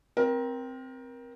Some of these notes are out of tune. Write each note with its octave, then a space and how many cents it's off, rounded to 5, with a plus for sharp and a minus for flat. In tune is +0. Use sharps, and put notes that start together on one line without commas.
C4 +0 A#4 +25